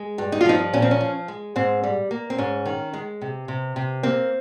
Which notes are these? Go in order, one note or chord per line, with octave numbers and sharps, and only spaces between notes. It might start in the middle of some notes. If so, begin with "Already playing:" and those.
Already playing: G#3
G2
D#4
F4
F3 C4 D#4
A#2 C#4
C4
C#4
F3
G#3
G#2 C4
G3
A#3
C4
G#2 C#4
D#3
G#3
C3
C3
C3
A#3 C4